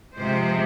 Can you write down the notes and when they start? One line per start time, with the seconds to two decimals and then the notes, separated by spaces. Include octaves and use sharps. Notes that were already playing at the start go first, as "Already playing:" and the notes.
0.15 C3 F3 G#3 C5